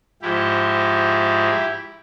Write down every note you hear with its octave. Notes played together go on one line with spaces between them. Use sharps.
G#2 F3 G#3 E4 G4